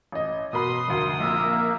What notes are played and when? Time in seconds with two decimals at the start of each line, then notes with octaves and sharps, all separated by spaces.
0.12 A1 D#5
0.53 B2 A#4 B5 C6 D#6
0.88 F1 D2 A#4
1.20 A#1 A#3 D#4 A#4 E5